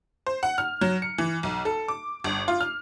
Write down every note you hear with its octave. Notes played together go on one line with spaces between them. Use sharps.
C5
F#5
F6
F#3
C#7
E3
B1
A4
D6
G1
F4
F6